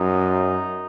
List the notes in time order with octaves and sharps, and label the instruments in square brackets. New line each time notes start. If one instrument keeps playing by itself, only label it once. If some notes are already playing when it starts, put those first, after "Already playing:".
Already playing: [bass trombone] F#2 [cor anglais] D#4